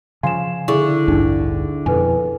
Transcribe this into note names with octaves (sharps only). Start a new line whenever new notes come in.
C#3 F3 F5 G#5 C6 E7
D3 E4 G#4 E5 C#6
A1 D2 G2 D4 D#4
F2 B2 A4 B4 G#5